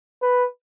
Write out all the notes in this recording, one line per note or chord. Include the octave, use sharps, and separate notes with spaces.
B4